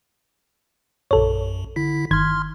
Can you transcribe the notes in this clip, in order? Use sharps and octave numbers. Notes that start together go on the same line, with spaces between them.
A#1 F#2 A4 C#5
D3 E4 B6
G1 D#3 C6 F6 G#6